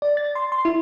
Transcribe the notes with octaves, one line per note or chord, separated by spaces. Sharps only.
D5
A6
C6
C6
E4